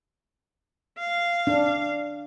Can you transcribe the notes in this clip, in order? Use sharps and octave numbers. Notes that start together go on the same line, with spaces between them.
F5
D4